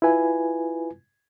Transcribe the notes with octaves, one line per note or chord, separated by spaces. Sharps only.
E4 F4 B4 G#5